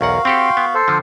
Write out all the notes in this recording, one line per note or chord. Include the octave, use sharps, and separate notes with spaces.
B1 E2 F#4 A#4 F5 F#5
C4 G4 A4 G5 C6
B3
A4 C5
D3 F3